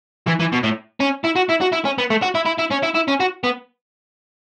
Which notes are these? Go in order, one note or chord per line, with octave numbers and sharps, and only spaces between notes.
E3
E3
B2
A2
C#4
E4
F#4
E4
F#4
E4
C#4
B3
A3
F#4
E4
E4
E4
C#4
E4
E4
C#4
F#4
B3